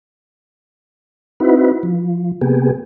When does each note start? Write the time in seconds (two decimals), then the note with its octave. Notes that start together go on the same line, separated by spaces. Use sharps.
1.40 C4 D#4 E4 F#4 B4
1.83 F3
2.41 C3 A#3 B3 G4 G#4